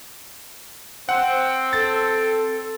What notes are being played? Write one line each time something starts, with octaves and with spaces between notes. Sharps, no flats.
C4 F#5
A4 A6